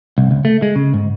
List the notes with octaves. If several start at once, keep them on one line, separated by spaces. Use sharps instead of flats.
C2
C#2
A3
G#3
C#3
G#2